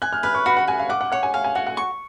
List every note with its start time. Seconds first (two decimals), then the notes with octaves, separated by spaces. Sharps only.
0.02 G#5 F#6
0.13 F6
0.23 B4 F6
0.35 C#6
0.46 F#4 B5
0.57 F#5
0.67 F#4 G#5
0.79 F5
0.90 F#5 D6
1.01 F#5
1.12 C#5 F#5
1.23 G#5
1.34 F5 G#5
1.44 G#5
1.55 F#4 F#5
1.67 F#5
1.77 C#6